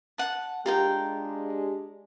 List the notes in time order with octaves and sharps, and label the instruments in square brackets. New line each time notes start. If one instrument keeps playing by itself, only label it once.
[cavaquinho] F#5 A5
[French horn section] G#3 D4 [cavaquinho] F4 A#4 G5 [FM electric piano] G4